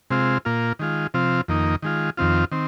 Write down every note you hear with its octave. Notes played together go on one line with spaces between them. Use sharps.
C3 G#3 C4 F4
A#2 A#3 F4
D#3 G#3 F4
C3 F3 C4 F4
F2 D#3 A#3 D#4
D#3 G#3 F4
F2 D#3 C4 F4
D#3 C4